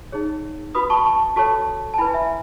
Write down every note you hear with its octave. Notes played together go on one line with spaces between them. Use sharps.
D#4 G#4 C#5
F#4 B4 B5 D#6
A5 C#6
A5 C#6
F#4 A4 C#5 A5 C#6
A5
E4 B4 G#5 B5
E5 G#5